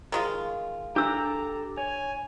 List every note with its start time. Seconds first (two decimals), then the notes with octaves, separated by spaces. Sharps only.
0.12 D#3 G#3 F4
0.96 D4 G4 A4 A#5 E6 F#6
1.77 C#5 G#5